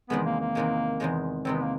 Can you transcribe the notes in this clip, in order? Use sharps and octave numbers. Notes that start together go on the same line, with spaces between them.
E2 C3 D#3 G#3 B3
A#3
A#3
E2 C3 D#3 G#3
E2 C3 D#3 G#3
E2 C3 D#3 G#3 C4
B3
A#3